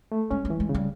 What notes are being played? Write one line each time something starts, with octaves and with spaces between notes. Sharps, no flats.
A3
G#3 C#4
G#3
E3
G#3
C#3
G3